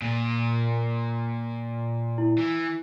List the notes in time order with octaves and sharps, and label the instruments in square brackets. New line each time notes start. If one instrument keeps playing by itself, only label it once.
[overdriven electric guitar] A#2
[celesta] E4
[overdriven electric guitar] E3